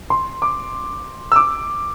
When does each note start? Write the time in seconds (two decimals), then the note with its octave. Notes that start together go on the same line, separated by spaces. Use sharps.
0.10 C6
0.42 D6
1.32 E6
1.36 D6